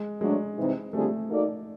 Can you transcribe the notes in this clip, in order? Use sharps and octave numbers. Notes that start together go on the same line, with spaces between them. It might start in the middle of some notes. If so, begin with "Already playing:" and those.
Already playing: G#3
F#3 G#3 A3 D4
C3 E3 G3 C4 D#4
D3 G3 A3 C4 F4 G#4
A#3 D#4 F#4 A4 D5